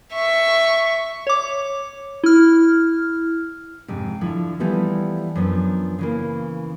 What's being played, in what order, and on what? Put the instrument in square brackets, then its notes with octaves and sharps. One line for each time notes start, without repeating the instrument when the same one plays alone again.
[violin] E5 C#6
[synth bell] C#5 D6
E4 F6
[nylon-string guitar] F2 G#2 C3
D3 F3 E4
E3 F3 G3 A3 B3 E4
F#2 F3 B3 D4
C#3 E3 A#3